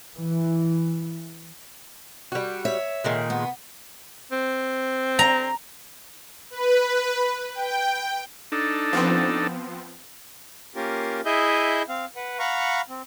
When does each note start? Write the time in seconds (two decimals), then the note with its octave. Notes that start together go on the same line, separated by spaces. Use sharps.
0.18 E3
2.32 G3 F#4
2.65 C#5 E5
3.04 A#2 D#3 G#3
3.30 B3
4.32 C4
5.19 A#5
6.50 B4
7.54 G5
8.52 D4 D#4 A4
8.93 F3 B3 C4
10.76 A#3 C#4 F4 G4 A#4
11.25 E4 G#4 D#5 E5 G6
11.89 C4 F5
12.16 B4 F#5
12.39 F5 F#5 A#5 B5 C#6
12.89 C4